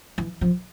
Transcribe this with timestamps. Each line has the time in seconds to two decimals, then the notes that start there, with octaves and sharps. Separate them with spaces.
0.18 E3
0.41 F3